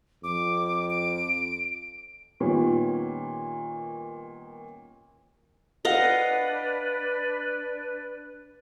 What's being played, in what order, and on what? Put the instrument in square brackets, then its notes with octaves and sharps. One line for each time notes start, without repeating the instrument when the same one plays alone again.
[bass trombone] F2 [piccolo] D6
[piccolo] D7
[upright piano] A#2 D#3 G3 B3 C#4
[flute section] D4 B4 D5 [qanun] D#5 F5 F#5